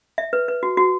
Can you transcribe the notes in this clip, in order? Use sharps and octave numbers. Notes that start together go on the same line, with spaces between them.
E5
B4
B4
F#4
F#4